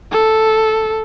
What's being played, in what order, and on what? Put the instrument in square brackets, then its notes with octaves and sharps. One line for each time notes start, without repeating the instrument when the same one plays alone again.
[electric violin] A4